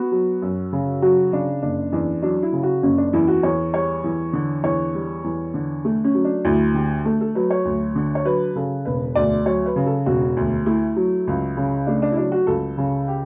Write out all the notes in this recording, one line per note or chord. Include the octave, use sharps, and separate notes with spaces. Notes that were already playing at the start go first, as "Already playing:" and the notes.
Already playing: B3 F#4
F#3
F#2
C#3
F#3 F#4
C#3 D4
F#1 D4
E2 D4
F#3 D4
E4
C#3
F#4
F#1 C#4
D4
E2 E4
F#4
E2 C#5
G3 C#5
E2
D3
E2 C#5
G3
E2
D3
A3
C#4
F#3
D4
D2 E4
D3 G4
A3 A4
A4
F#3 B4
C#5
D2
D3
C#5
F#3 B4
C#3 A4
E1 B4
D2 D5
F#3 C#5
B4
C#3
A4
E1 F#4
D2
A3 E4
F#3
C#2
C#3
A3 D4
D4
E4
F#3 D4
F#4
C#2 A4
C#3
G4